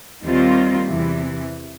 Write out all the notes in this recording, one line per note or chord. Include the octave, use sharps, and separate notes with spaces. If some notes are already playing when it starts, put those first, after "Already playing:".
D#2 D#3 G3 C4 F4
E2 C3 E3